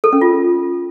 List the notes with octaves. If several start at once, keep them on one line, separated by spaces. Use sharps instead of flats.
A4
C#4
F4